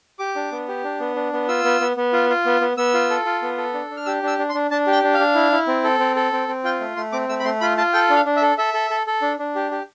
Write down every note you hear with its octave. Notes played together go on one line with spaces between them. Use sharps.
G4 D6
D4
B3
G4
D4
B3
D4
B3
F4 E6
B3
B3
B3
F4
F4
B3
B3
B3 E6
F4
A4
F4
B3
A4
D4
D4
F6
G4 E6
D4 E6
D4
C6
D4
D4 A5
G4
G5
D4
F5
D4
E4
E4
C4
A4
C4
A4
C4
C4
F4 G5
A3
A3 C6
C4 D6
A3 E6
B5
A3 C6
F4 B5
F4 A5
A4 G5
D4
F5
D4
E5
A4
A4 E5
A4
A4
A4
D4
D4
G4
G4